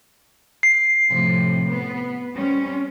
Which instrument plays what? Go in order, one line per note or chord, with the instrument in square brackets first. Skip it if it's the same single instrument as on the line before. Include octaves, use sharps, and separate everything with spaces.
[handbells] C7
[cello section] A2 C3 F3
B3
G3 C4 C#4